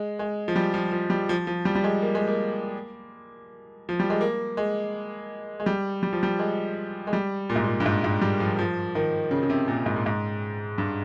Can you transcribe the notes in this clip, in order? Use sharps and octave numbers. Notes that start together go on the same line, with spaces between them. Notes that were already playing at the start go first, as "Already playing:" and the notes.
Already playing: G#3
G#3
F3
G3
F3
F3
G3
F3
F3
G3
G3
G#3
A#3
G#3
A#3
F3
G3
G#3
A#3
G#3
G#3
G3
G3
F3
G3
G#3
G#3
G3
A#2
G#2
A#2
G2
G#2
G#2
G3
F3
F3
D#3
C#3
C#3
C3
A#2
G#2
A#2
G#2
G2